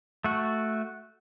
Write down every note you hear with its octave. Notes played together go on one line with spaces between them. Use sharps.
A3 F#4